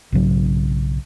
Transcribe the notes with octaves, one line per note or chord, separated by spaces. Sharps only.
B1 G#2 C#3 F#3